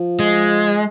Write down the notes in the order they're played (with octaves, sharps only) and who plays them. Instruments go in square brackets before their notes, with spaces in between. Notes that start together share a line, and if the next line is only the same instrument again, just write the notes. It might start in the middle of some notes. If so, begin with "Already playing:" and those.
Already playing: [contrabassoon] F3
[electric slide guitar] G#3